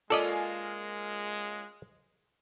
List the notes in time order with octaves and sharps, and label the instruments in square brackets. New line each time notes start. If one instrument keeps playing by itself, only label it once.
[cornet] G#3 [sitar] A#3 C#4 F4 [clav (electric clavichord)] A4 D5 D#5